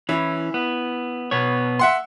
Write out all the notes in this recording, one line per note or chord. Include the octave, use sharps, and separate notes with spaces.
E3 C#4 E4
B3
B2 B3 C#5
E5 F#5 C6